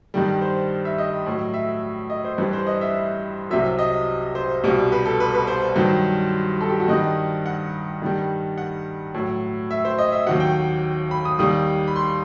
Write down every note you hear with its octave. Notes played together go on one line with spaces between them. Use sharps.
G2 D#3 G3
C5
E5
D#5
A2 F#3
E5
D#5
C5
G2 E3 G3 B4
C5
D#5
E5
E5
C2 C3 F#3 E5
E5
D#5
C5
C2 B2 G3
B4
A4
B4
B4
C5
G2 D#3 F#3
A4
G4
F#4
G2 D#3 G3 D#5
F#5
G2 D#3 G3
F#5
A2 F#3
E5
C5
D#5
E5
D#2 D#3 F#3 F#5
G5
B5
D#6
D#2 D#3 G3 D#6
B5
C6